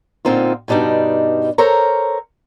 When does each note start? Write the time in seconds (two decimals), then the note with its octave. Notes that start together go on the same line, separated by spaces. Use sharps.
0.25 A#2 D3 C4 D#4 F4
0.68 G2 B2 G3 D4 D#4
1.58 A4 A#4 C5 C#5 A#5